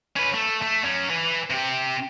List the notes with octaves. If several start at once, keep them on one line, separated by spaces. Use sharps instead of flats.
C#4 B4
A3
A3
F#3 C#4
B4 G#5
C3 G4